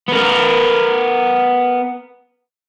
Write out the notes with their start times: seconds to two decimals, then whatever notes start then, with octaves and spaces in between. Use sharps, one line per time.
0.09 B3 A#4